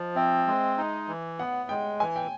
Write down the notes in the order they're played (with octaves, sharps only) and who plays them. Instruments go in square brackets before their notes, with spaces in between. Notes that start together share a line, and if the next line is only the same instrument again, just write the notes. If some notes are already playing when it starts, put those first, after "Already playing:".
Already playing: [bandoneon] F3 [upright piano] D#5
[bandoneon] C4 [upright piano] E5
[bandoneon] G#3
D#4
E3
[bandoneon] B3 [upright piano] F#5
[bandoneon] G#3 [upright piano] G5
[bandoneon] E3 [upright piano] G#5
[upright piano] G5